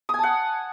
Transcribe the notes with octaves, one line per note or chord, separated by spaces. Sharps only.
F#5 G#5 A5 D#6